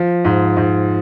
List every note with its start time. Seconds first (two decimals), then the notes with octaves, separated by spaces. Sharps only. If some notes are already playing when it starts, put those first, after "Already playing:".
Already playing: F3
0.25 G#2
0.57 G#2